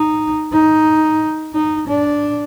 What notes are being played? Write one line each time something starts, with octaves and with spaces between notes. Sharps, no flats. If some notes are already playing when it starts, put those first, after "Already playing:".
Already playing: D#4
D#4
D#4
D4